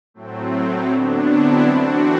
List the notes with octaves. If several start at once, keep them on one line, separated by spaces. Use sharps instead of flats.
A2 F#3 A3 C4
D3 F#3 B3 D4
C4 E4
E3 A3 C4 D4 F#4